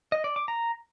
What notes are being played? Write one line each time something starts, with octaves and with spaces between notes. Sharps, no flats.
D#5
D5
D6
A#5